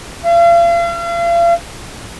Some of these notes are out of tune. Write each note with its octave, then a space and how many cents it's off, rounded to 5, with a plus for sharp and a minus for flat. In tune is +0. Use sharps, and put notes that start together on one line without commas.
F5 -40